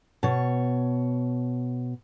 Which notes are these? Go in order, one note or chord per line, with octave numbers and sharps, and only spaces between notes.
B2 C#5